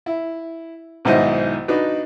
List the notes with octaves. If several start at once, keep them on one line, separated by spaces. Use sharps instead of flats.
E4
B1 G#2 D#3 E4 C5 D#5
D4 D#4 F#4 B4